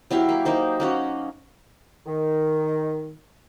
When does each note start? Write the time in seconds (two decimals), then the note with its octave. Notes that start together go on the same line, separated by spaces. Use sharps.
0.11 F#3 E4 G4 F5
0.29 A#3
0.45 A#3 D#4 C5
0.80 A#3 C#4 F#4
2.06 D#3